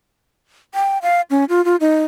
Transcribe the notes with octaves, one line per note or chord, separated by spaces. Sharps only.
G5
F5
C#4
F4
F4
D#4